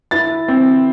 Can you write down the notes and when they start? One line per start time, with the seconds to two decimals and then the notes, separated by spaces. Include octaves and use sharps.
0.11 E4 A6
0.48 C4